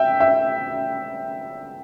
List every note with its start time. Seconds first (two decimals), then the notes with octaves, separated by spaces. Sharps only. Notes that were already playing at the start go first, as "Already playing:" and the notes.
Already playing: E5 G5
0.20 E5